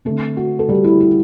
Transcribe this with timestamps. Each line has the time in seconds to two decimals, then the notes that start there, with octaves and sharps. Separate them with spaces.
0.05 D3 A3 C4 A4
0.37 F#4
0.59 A4
0.69 G3 G4
0.84 E4
1.00 E4